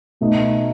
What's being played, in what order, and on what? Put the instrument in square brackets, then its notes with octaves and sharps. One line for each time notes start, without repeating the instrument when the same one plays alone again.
[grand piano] B2 A3 D#4